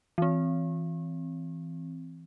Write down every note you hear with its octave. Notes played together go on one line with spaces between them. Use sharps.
E3 C4